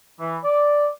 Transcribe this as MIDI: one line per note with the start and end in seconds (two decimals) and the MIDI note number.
0.19 0.38 52
0.44 0.88 74